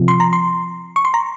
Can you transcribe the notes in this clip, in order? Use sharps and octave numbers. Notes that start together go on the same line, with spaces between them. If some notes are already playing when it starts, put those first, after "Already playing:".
Already playing: C3 F3 C4 F4
C6
A#5
C6
C#6
C6
A#5